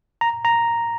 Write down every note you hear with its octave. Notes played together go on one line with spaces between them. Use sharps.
A#5
A#5